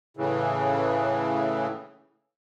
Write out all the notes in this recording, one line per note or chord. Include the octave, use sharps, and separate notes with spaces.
A2 C#3 E3